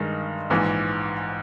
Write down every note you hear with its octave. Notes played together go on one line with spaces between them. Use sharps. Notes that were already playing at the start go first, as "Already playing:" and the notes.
Already playing: G2 D#3 G#3 D#4
A#1 G#2 E3